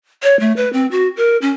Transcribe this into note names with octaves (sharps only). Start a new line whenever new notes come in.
C#5
A3
B4
C4
F#4
A#4
C#4